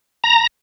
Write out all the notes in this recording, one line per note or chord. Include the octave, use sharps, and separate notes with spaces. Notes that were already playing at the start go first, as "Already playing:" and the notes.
A#5